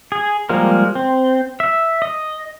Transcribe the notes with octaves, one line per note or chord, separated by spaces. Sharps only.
G#4
F3 G3 G#3 A#3 A#4
C4
E5
D#5